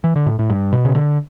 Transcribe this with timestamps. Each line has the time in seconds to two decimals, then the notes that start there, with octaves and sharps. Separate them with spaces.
0.04 E3
0.16 D3
0.26 A2
0.39 A2
0.50 G2
0.73 B2
0.85 C#3
0.95 D3